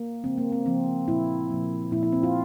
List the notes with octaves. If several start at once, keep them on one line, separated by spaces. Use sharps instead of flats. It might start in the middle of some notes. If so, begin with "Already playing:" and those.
Already playing: A#3
C#3 F3 G#3 C4
A#3
C4
C#3 F3 G#3 C4
A#2 F3 A#3 E4
A#2 F3 A#3
A#2 F3 A#3 E4
E4
C4
F4